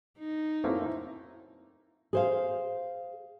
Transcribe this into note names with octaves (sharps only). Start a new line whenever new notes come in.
D#4
F#2 A3 A#3 C4 E4
G#4 C5 F5